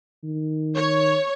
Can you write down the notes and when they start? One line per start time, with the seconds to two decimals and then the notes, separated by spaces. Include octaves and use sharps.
0.23 D#3
0.76 C#5